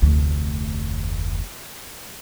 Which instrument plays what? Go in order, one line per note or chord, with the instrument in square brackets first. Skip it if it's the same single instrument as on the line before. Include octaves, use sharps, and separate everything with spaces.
[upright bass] F1 D2